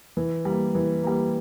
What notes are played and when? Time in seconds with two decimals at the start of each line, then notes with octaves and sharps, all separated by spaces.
0.17 E3
0.45 G3 A#3
0.75 E3
1.03 G3 A#3